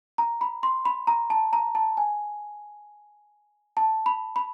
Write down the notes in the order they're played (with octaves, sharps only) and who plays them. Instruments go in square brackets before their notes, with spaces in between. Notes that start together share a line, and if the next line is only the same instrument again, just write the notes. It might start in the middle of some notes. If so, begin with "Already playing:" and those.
[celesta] A#5
B5
C6
B5
A#5
A5
A#5
A5
G#5
A5
B5
B5